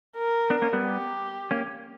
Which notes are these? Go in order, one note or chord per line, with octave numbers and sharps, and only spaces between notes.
A#4
B3 D4
A#3 C#4
G3 B3
G4
A#3 C#4